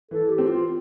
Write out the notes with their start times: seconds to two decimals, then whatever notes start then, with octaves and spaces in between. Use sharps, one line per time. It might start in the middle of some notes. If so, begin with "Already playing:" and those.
0.11 E3 A4
0.29 G4
0.38 C4
0.47 F4